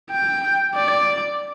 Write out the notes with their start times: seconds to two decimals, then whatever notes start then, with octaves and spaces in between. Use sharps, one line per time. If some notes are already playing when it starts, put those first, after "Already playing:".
0.11 G5
0.75 D5